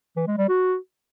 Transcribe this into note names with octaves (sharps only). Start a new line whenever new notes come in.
E3
G#3
G3
F#4